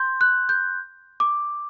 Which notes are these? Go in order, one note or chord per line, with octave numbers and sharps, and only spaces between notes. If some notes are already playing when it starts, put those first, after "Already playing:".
Already playing: C6 G6
F#6
G6
D6